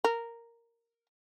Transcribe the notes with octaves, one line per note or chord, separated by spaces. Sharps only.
A#4